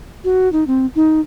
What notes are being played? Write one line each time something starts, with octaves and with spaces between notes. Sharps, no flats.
F#4
D#4
C4
D#4